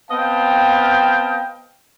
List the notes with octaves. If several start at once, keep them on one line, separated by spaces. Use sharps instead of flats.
B3 C4 D#5 F5 G5 A5